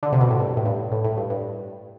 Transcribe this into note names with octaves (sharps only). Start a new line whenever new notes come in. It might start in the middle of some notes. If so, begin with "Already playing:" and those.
D3
C3
B2
A2
G2
A2
G2
A2
A2
G2
G2